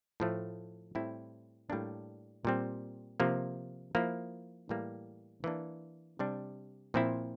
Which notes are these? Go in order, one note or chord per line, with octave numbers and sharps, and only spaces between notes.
A2 F3 A3
A2 G3 C4 E4
A2 G3 A#3 D4
A#2 G3 C4
C3 F3 A#3
F3 A#3 E4
A2 E3 G3 A#3
E3 A#3 D4
C3 G3 D4
A#2 F3 C4 E4